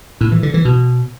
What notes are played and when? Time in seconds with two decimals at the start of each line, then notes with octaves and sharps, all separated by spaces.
0.21 A2
0.32 E3
0.43 D3
0.54 E3
0.65 B2